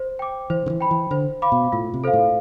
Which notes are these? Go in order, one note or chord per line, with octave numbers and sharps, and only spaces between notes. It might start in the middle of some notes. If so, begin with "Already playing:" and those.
Already playing: C5
G5 D6
E3 C5
D3
E3
G5 B5
E3
D3 C5
F5 B5 D6
B2
A2 F4
C3
A4 C5 F5
A2